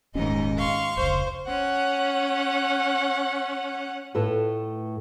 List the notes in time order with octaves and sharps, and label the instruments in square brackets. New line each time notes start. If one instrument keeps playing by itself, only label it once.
[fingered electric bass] D#1 C#4 [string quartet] D#2 G#2 D#4 [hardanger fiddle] D#5
[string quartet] F5 C6 C#6
[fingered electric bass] F1 C#2 [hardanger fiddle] C5
[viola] C#4 F#5
[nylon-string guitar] A2 A3 F4 A4 B4